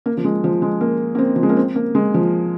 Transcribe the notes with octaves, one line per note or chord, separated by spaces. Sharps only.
A#3
F3
G#3
F3
G#3
A#3
A#3
C4
F3
G#3
A#3
C4
A#3
G#3
F3